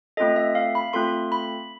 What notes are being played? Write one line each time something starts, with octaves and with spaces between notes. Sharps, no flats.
A3 C4 F4 A4 D#5
E5
F5
B5
A3 C4 F4 A4 C6
B5